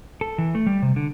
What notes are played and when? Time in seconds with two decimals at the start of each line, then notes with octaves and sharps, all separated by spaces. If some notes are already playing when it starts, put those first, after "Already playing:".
0.21 A4
0.38 E3
0.55 A3
0.66 G3
0.82 C3
0.96 D3